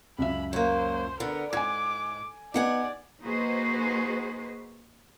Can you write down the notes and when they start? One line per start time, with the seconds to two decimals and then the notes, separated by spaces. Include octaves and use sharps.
0.19 C#2 F#2 E5 B5
0.53 F#3 A#3 C5
1.20 D3 B3 A#4
1.53 G#2 G#5 D6 G#6
2.54 B3 D#4 G4 D5 F#5 G#5
3.22 A#3 D#4 F#4 G#4 B4 C5